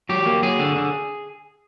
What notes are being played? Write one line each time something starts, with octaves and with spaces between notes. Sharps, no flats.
F#3 G4
A#3
F#3 G#4
D3
D3